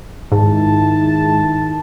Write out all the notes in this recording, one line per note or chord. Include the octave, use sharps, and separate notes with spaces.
G#2 D#3 E4 A5